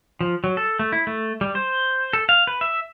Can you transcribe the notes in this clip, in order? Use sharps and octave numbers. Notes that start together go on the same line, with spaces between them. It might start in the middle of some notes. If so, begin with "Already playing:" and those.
F3
F#3
A4
A3
E4
A3
G3
C5
A4
F5
B4
E5